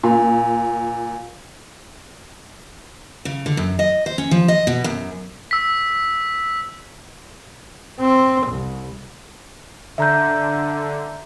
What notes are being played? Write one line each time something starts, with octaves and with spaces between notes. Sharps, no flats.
A#2
C#3
D3
F#2
D#5
C5
C#4
F3
D#5
B2
F#2
E6 B6
C4
C2
D3 E5 A#5 G6